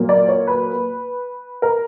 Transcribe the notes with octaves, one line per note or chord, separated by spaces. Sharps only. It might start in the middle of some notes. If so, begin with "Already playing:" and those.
Already playing: A#2 F#3 A#3
D5
C#5
B4
A#4